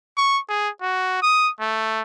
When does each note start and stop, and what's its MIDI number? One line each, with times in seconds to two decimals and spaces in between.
0.17 0.39 85
0.49 0.69 68
0.82 1.21 66
1.22 1.50 87
1.60 2.02 57